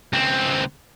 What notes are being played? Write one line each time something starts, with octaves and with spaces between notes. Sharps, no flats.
C#2 C4